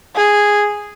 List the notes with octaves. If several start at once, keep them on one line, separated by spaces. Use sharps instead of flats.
G#4